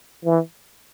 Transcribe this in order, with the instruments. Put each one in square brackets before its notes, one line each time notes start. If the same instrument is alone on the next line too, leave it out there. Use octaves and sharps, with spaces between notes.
[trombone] E3